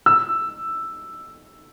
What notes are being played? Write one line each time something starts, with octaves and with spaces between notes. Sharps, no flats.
E6